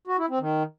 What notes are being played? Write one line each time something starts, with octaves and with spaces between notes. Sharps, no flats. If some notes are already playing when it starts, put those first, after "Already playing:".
F#4
E4
C4
D#3